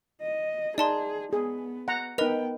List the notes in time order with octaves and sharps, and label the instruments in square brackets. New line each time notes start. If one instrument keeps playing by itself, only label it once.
[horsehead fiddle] D#5
[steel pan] D#4 [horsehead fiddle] G#4 [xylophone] D5 A5 C6
[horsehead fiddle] B3 [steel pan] G#4
[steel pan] F#5 A#5
[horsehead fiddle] B3 G5 [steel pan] D#4 B4 [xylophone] A#4 D#5 F7